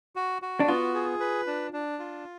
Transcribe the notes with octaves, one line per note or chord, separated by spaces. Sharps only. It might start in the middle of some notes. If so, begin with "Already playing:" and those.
F#4
F#4
D4
B3 F4
G#4
B4
D4
D4
F4